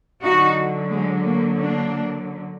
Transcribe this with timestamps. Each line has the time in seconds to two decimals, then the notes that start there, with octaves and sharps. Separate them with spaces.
0.23 D3 F#3 D#4 F#4
0.90 G#3
1.24 A#3
1.57 A#3 D4